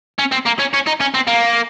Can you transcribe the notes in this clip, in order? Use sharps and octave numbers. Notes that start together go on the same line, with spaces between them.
C#4
C4
A#3
C#4
C#4
D#4
C#4
C4
A#3